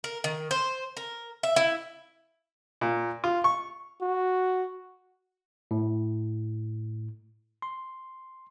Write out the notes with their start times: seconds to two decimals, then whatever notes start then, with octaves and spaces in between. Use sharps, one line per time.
0.04 A#4
0.24 D#3
0.51 C5
0.97 A#4
1.43 E5
1.56 E4
2.81 A#2
3.24 F4
3.44 C#6
4.01 F#4
5.71 A2
7.62 C6